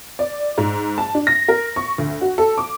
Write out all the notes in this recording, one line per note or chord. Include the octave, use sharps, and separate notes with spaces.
D5
G#2
A5
D4
A#6
A#4
C#6
D2
F#4
A4
D6